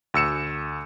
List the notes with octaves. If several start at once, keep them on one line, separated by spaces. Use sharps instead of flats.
D2 E6 C#7 E7